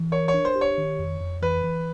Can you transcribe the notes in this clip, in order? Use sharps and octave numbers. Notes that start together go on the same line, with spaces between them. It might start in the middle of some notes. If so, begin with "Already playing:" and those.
Already playing: E3
A#4 C#5
C#5
D4
C5
G4
C#5
D#3
F2
F2
E3 B4
E3